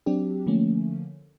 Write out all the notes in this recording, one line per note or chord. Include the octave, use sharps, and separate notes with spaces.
F#3 C4 D4 G4
D3 F3 A3 A#3 C#4